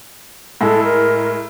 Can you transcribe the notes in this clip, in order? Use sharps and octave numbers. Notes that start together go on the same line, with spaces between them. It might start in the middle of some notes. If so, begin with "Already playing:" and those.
A2 G#3 A4
A#4